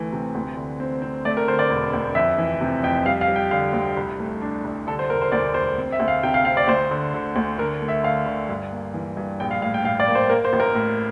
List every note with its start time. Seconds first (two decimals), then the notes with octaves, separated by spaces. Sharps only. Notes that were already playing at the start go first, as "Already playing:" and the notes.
Already playing: D2 E3 A3
0.13 C3
0.35 D2
0.57 D3
0.80 C4
1.02 C4
1.25 A3 D5
1.37 A#4
1.48 D3 C5
1.59 D5
1.70 E1
1.93 D2
2.15 F2 E5
2.38 E3
2.61 C3
2.83 F2 G5
3.06 G3 F5
3.21 F5
3.28 G3
3.36 G5
3.51 D3 F5
3.73 D2
3.97 C2
4.20 A3
4.41 D4
4.64 C2
4.87 D3 A4
4.99 C5
5.10 E1 A#4
5.22 C5
5.32 D2 D5
5.54 E1 C5
5.78 C4
5.92 E5
6.00 D2
6.08 F5
6.23 C3 G5
6.34 F5
6.45 C4 F5
6.57 D5
6.67 D2 C5
6.91 D3
7.14 D3
7.36 D2
7.58 D3 A#4
7.82 A3
7.88 E5
8.03 D3 F5
8.26 D3
8.49 G2
8.72 A#3
8.94 E3
9.17 G2
9.40 A#1 G5
9.51 F5
9.62 A2 F5
9.74 G5
9.84 A2 F5
10.00 D5
10.08 A#3
10.15 C5
10.30 A#3 A#4
10.45 C5
10.53 A1
10.60 A#4
10.75 A2